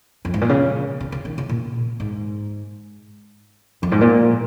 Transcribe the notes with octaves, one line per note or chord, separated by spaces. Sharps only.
F2
G#2
A#2
C#3
C#3
C#3
D#3
C#3
A#2
G#2
F2
G#2
A#2